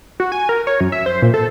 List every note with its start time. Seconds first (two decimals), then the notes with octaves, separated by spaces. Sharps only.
0.20 F#4
0.32 G#5
0.49 A#4
0.67 C#5
0.80 F#2
0.92 E5
1.06 C5
1.22 A#2
1.34 A4